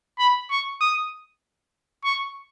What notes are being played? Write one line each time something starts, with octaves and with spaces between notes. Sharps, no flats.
B5
C#6
D#6
C#6